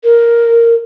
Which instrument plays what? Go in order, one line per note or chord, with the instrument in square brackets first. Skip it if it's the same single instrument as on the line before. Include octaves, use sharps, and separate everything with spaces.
[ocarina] A#4